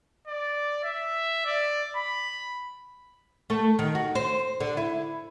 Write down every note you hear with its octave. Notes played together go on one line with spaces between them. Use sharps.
D5
E5
D5
B5
A3
D#3
F#4
C5
D3
E4